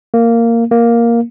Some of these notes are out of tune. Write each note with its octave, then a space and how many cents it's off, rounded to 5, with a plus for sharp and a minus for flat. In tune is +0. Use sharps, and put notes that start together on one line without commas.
A#3 -10
A#3 +5